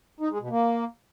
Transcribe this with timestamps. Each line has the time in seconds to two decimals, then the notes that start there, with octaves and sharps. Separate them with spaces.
0.20 D#4
0.30 G#3
0.40 B2
0.50 A#3